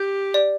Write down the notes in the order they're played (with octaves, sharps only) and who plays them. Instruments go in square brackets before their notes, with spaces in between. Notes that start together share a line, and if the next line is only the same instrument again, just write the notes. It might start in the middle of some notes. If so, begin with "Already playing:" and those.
Already playing: [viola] G4 [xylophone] G6
[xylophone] D5